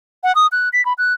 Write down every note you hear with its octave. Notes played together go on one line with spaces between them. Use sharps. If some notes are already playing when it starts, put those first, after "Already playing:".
F#5
D#6
F#6
B6
B5
F#6